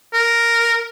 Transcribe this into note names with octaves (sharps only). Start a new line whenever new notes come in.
A#4